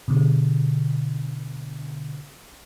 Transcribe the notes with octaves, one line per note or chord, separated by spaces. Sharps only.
B2 D3